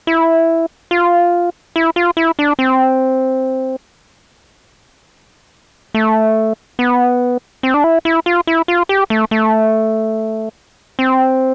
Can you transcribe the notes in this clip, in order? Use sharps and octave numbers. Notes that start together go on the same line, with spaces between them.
E4
F4
E4
F4
E4
D4
C4
A3
B3
C4
D4
E4
E4
F4
E4
F4
G4
A3
A3
C4